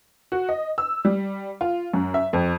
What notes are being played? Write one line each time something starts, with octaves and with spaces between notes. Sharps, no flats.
F#4
D#5
E6
G3
F4
F#2
E5
F2